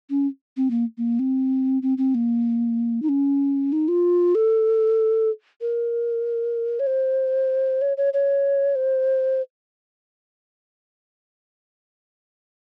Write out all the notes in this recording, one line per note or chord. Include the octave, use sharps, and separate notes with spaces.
C#4
C4
A#3
A#3
C4
C4
C4
A#3
D#4
C#4
D#4
F4
A4
A#4
C#5
C5
C#5
C#5
C#5
C5